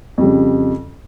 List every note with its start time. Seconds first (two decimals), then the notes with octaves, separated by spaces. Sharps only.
0.18 F2
0.21 G3
0.23 C#3